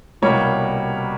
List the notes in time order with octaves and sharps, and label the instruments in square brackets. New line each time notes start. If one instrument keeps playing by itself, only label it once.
[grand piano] C2 B2 G3 A#3 C#5